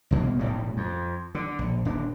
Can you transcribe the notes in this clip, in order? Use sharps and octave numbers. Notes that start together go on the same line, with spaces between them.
C2 B2 G3 A#3
E1 A#1 A2 G3
F2
D3
A#1
D#1 D4